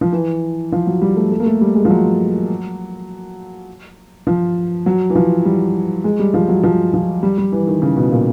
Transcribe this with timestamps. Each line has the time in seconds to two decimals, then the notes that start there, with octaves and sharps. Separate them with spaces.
0.01 F3
0.12 E3
0.72 F3
0.87 F#3
1.02 G3
1.17 A3
1.32 A3
1.40 A#3
1.46 A3
1.61 G3
1.75 G#3
1.85 F3
1.90 F#3
4.27 F3
4.86 F#3
5.10 E3
5.15 F3
5.45 G3
6.04 G#3
6.19 G3
6.34 F3
6.49 F#3
6.63 F3
6.94 F3
7.23 G3
7.38 G3
7.52 E3
7.67 D#3
7.82 C#3
7.97 B2
8.11 A#2